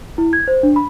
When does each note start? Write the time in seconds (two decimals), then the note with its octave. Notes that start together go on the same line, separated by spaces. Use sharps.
0.18 E4
0.33 G#6
0.48 C5
0.63 D4
0.76 B5